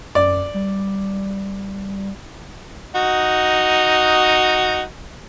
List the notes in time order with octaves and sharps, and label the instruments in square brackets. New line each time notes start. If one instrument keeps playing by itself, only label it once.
[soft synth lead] F#2 [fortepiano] D5
[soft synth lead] G3
[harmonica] D#4 F#4